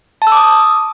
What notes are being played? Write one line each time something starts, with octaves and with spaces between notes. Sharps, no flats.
A5
E6
D6
D#6